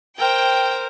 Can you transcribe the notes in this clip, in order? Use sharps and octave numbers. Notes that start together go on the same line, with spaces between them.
A#4 C5 G5